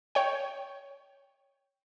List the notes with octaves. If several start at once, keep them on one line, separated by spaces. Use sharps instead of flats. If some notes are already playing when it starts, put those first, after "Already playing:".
C#5 G5